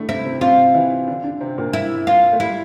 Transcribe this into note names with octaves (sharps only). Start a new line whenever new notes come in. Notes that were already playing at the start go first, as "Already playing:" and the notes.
Already playing: A2 D3 A3 D4
C3 C4 E4
C3 C4
C3 C4 F4
E3 E4
D3 D4
D3 D4
C3 C4
A#2 A#3
E4
F4
A3
G3 E4